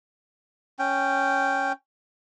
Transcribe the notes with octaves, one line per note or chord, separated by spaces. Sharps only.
C#4 G5